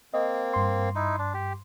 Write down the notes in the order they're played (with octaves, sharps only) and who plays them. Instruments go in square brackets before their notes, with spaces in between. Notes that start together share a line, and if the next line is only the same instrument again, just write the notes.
[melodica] A#3 C4 [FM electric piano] D#5
[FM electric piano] G2 C6
[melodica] D#4 E4
D4
G4